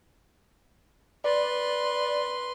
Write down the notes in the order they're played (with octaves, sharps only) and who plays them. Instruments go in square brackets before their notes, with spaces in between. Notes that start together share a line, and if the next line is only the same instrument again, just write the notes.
[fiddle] B4 C6 [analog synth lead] D5